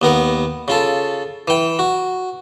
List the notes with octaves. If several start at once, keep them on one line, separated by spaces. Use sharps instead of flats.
D#2 B3 A#4 F#5
C#3 F4 A4
E3 G5
F#4